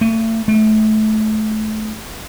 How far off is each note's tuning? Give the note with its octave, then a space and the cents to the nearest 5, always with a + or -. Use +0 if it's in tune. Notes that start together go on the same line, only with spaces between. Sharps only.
A3 +35
A3 -25